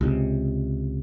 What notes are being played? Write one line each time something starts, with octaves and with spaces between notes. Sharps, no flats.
C#2 C3